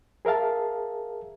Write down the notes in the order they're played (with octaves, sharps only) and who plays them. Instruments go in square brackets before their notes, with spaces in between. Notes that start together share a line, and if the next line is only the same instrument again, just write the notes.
[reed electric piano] G#4 A#4 E5 F5 A5